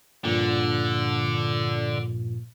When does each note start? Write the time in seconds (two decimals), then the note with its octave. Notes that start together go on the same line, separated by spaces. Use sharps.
0.25 G2 A#2 D3 F3